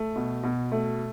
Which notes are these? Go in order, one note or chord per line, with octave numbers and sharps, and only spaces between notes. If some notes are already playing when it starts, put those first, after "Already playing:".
Already playing: A3
B2
B2
A3